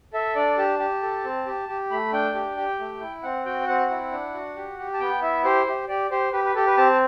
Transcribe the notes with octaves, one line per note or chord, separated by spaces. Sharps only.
A4 E5
D4 D5
G4 A5
G4
A4
C4
G4
G4
A3 B5
D4 G5
G4
G4
A3
E4
C4 F#5
F#4 G5
C4 F#5
E4
D4
F#4
G4
G4
A5
B3 G5
E4 E5
G4 C5
G4
G4 D5
G4 C5
G4 B4
B4
G4 A4
B4
C4 A5